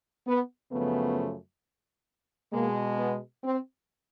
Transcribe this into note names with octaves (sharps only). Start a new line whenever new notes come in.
B3
F#2 C#3 F3 A3 B3
B2 G#3 A#3
B3
C4